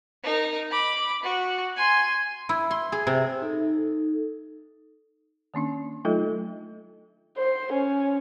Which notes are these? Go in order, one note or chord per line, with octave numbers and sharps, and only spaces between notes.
D#4 A#4
B5 D6
F#4
G#5 C6
E4
C6
G#4
C3
D#4 A4
D#3 A#3 C#4 D4
F#3 A3 D#4 F4 A4 D#5
C5
C#4